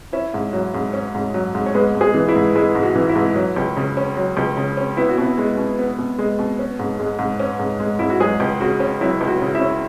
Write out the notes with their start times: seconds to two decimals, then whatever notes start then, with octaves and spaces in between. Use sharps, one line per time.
0.13 C#4 E4 E5
0.34 G#2
0.53 F#3
0.74 G#2
0.93 C#4
1.15 G#2
1.34 F#3
1.55 G#2
1.66 C#5
1.74 G#3 B3 B4
1.95 G#2
2.01 G#3 G#4
2.14 E3
2.28 E4
2.36 G#2
2.55 G#3 E4
2.75 G#2
2.83 F#4
2.96 E3
3.09 E4
3.15 G#2
3.35 F#3
3.56 C#2
3.76 C#3
3.97 C#4
4.17 F#3
4.37 C#2
4.57 C#3
4.77 C#4
4.97 B3 E4
5.09 F#4
5.18 B2 E4
5.38 G#3
5.57 B2
5.79 B3
5.98 B2
6.18 G#3
6.39 B2
6.59 C#4
6.79 G#2
6.99 G#3
7.19 G#2
7.40 C#4
7.59 G#2
7.80 G#3
7.99 G#2 E4
8.10 F#4
8.20 F#3 G#3 G#4
8.40 C#2
8.60 C#3 F#4
8.80 C#4
9.01 F#3 E4
9.21 C#2
9.28 F#4
9.41 C#3
9.55 E4 E5
9.61 C#4